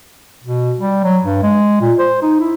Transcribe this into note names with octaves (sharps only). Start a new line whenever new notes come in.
B2
G3
F#3
G2
G#3
A#2
C5
D#4
E4